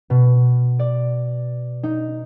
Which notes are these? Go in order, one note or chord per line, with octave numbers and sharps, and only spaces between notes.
B2
D5
D#4